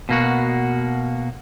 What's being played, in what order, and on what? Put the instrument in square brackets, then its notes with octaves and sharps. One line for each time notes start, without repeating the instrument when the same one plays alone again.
[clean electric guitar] B2 A#3 F#4